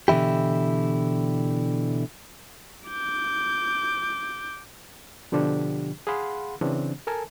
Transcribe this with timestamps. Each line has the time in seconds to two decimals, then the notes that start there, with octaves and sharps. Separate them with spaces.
0.08 B2 D3 E3 E4 G4
2.89 D6 G6
5.32 B2 D3 F3 D4 G4
6.07 G#4 F5 F#5 B5 C6
6.61 C#3 E3 C4 D4
7.07 A4 A#4 G#5 A5